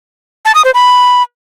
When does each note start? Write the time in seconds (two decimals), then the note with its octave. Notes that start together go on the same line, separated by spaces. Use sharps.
0.45 A5
0.55 D#6
0.65 C5
0.74 B5